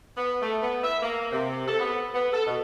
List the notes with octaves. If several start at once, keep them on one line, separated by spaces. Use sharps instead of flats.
B3
A3
B3
E5
A#3
C3
A4
B3
B3
A4
B2